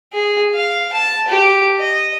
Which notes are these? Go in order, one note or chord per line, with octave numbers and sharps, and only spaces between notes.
G#4
F5
A5
G4
D#5